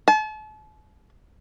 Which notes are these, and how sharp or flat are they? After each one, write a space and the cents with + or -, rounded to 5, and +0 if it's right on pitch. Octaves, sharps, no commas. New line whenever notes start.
A5 -40